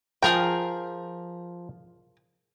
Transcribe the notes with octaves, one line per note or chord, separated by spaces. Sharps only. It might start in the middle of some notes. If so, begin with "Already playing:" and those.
F3 G#4 A#4 G5 A#5